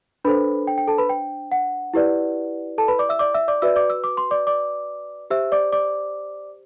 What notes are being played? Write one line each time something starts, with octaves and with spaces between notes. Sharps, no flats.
D4 A4 B4 C5 B5
G5
G5
A4 A5
B4 B5
G5
F#5
E4 G4 B4 D5
A4 A5
B4 B5
D5 D6
E5 E6
D5 D6
E5 E6
D5 D6
F#4 B4 D5 E5 E6
D5 D6
E6
D6
C6
D5 D6
D5 D6
G4 C5 E5 E6
D5 D6
D5 D6